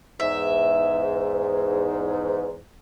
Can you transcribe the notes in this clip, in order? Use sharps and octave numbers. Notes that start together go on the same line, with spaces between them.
E2 G#2 E5